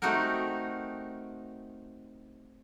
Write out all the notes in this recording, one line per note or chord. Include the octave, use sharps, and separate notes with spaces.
A3 C4 D#4 F#4 G4 A#4